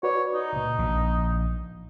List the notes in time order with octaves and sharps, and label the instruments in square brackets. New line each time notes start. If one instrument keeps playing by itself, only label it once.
[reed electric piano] F#4 B4 D5 [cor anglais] C#5
[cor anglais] D#4
[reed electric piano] C#2 A#2
[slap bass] A#1